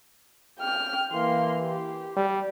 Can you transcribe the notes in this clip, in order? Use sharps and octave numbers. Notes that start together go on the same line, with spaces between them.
G5 F6
E3 A#3 C6
G4
G3